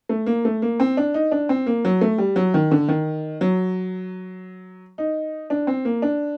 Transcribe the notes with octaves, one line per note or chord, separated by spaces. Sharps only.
A3
A#3
A3
A#3
C4
D4
D#4
D4
C4
A#3
F#3
A3
G3
F#3
D#3
D3
D#3
F#3
D#4
D4
C4
A#3
D4